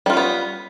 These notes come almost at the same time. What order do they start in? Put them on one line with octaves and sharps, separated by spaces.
G3 F4 C#4 B3